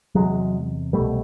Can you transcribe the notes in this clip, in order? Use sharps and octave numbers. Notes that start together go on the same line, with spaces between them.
E2 C3 F#3 G#3
C2 B2 G3 A3